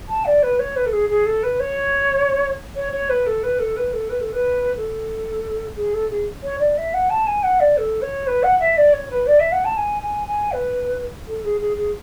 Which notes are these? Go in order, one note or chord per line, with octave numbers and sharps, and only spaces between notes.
A5
D5
B4
C#5
B4
A4
G#4
G#4
A4
B4
C#5
C#5
C#5
B4
A4
B4
A4
B4
A4
B4
A4
B4
A4
G#4
A4
G#4
C#5
D5
E5
F#5
A5
G#5
F#5
D5
A4
C#5
B4
F#5
E5
D5
C#5
B4
D5
E5
F#5
A5
G#5
G#5
G#5
B4
A4
G#4
G#4
G#4